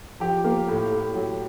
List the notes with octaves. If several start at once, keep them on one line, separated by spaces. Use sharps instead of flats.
F3 G4
A#3
A2
A2
F#3